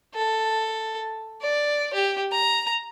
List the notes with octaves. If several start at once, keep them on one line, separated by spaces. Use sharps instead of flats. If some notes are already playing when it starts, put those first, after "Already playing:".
A4
D5
G4
A#5